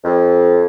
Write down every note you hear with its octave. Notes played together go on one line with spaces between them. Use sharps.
F2